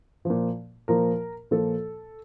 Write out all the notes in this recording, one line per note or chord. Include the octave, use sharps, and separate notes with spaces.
F3
A#2
A#2 F3 A#4
A#2 F3 A4